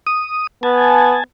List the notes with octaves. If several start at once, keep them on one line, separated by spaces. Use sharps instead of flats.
D#6
B3 G#5 A5